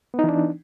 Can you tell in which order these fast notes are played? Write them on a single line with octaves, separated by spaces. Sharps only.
B3 D#4 E3 D4